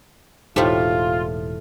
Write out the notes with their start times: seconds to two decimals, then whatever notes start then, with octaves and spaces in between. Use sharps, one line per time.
0.56 E1 A2 A3 D#4 F4 G4 C5